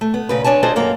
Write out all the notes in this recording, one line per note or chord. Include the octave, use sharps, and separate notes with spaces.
A3
B3
A#2 C#3 B4
G#3 D4 C#5 G#5 A5
D4 F4 G#4 A4 C5 D#5
F#2 A#3 F5 A#5